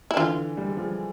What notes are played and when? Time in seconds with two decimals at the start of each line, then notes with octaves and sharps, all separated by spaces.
0.11 E4
0.17 D3 E3 F4
0.57 G3
0.67 G#3
0.77 F3 G3